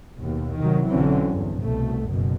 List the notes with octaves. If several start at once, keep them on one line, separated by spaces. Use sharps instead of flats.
D#2 B2
C3 D#3 F#3
B1 D3 E3 F#3 C4 C#4
E2 G2
C2 B2 A3
F#1 F#2 B2